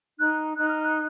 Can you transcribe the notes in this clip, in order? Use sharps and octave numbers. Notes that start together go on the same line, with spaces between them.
D#4 F#6
D#4 F#6
F6
F#6